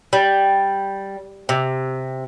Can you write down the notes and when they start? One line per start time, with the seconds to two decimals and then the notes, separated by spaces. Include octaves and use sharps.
0.13 G3
1.49 C3